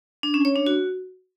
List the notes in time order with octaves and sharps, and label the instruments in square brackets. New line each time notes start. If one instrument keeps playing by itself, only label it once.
[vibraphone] D4
C#4
C#5
D4
F#4